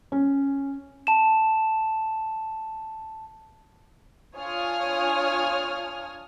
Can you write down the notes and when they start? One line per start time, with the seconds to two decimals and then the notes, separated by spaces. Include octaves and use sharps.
0.12 C#4
1.07 A5 E7
4.35 D4 F4 C#5 G#5 D#6 F6